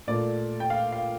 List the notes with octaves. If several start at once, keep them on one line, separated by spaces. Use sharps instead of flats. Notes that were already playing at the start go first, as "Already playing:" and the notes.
A#2 A3 D5
G5
F5
F5